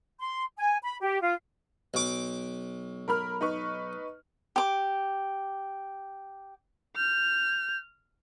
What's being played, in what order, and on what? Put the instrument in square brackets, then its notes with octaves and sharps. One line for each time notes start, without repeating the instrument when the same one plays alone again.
[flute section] C6
G#5
B5
G4
F4
[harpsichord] B1 D6
[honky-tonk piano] A#4 B5 F6
D#4 B4 C#6
[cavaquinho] G4 D6
[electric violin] F6 [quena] G6